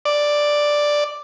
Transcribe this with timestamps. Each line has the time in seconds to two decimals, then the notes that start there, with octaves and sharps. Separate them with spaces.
0.05 D5